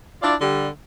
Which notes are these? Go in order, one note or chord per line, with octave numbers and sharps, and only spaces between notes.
D4 E4 F4 D5
D3 G3